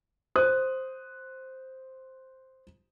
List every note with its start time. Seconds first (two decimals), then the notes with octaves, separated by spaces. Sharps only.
0.36 C5 D#6 F#6